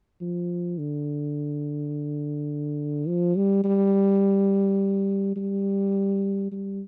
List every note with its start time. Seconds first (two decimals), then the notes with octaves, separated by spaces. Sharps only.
0.21 F3
0.78 D3
3.08 F3
3.36 G3
3.64 G3
5.37 G3
6.52 G3